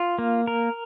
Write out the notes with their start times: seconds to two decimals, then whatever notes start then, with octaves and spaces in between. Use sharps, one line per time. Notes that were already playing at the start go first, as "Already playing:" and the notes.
Already playing: F4
0.19 A#3
0.47 A#4